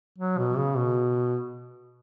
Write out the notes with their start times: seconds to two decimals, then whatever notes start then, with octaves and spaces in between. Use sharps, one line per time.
0.18 F#3
0.38 B2
0.58 C#3
0.77 B2